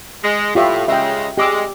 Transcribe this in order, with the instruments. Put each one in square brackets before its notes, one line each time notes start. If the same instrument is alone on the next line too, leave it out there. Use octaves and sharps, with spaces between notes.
[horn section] G#3
[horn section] A2 [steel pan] F4 G4 E5
[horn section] C#3 G#3 [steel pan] E5 G5
[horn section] G#3 [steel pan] G4 D6 E6